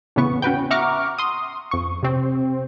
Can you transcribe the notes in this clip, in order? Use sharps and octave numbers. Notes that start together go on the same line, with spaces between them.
E2 A2 C#3 B3 C#6
C#4 F#4 B4 G5
E5 F#5 A#5 C#6 D6 F6
C6 D#6
F2 C#6
C3 C4